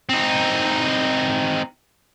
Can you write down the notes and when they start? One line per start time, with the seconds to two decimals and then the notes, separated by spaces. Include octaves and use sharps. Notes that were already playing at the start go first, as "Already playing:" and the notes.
0.10 C4 D#4